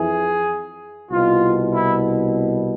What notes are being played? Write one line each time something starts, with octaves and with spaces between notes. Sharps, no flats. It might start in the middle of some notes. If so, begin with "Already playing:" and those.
Already playing: F2 E3 G#4
C2 B2 F4
E4